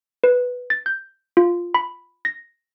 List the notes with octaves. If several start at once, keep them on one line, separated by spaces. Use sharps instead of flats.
B4
A6
G6
F4
B5
A#6